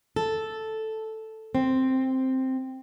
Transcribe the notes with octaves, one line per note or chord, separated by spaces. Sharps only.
A4
C4